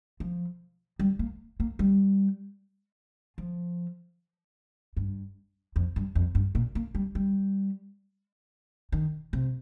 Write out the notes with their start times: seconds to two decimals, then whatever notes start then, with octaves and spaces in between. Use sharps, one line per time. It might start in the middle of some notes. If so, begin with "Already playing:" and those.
0.20 F3
0.99 G3
1.19 A#3
1.60 A#3
1.79 G3
3.38 F3
4.97 G2
5.76 F2
5.96 G2
6.15 F2
6.35 G2
6.55 A#2
6.75 A#3
6.95 G3
7.15 G3
8.92 D#3
9.33 C3